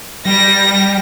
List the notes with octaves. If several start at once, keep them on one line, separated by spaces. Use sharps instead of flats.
G3 A#6